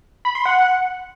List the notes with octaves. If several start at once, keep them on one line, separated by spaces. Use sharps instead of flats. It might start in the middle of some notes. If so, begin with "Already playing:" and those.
B5
C6
F#5